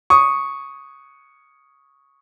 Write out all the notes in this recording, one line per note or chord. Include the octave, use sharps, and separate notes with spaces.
C#6 D#6